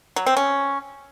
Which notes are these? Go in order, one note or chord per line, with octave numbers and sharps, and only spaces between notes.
F#3
C4
C#4